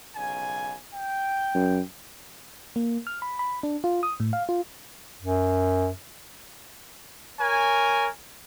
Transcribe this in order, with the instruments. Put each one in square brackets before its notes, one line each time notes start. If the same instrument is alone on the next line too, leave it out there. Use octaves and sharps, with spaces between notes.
[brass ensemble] B1 C#3 G#5
G5
[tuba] F#2
[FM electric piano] A#3
F6
B5
B5
D4
F4
D#6
A2
F5
F4
[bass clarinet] F#2
[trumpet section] A#4 C#5 G#5